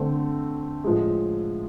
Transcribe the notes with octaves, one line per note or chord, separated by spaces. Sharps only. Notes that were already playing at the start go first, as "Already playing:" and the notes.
Already playing: D3 A3 C4
A2 F3 G#3